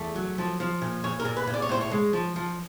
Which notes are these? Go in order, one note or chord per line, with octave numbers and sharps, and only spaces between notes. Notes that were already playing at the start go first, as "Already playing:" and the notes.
Already playing: E2 A3
F#3
F3
F3
A#2
A#2 C#5
A#4
A#2
B4
A#2
D5
C#5
A2 C5
C#5
G#3
F3
F3